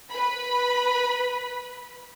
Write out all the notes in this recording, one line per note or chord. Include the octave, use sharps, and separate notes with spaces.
B4 B5